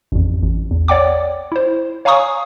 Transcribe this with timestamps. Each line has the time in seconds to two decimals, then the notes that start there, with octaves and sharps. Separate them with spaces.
0.12 A1 F2
0.43 A1
0.71 E2
0.88 C#5 D5 F#5 G5 D6
1.52 E4 C5
2.05 C#5 F5 G#5 A#5 C#6 D#6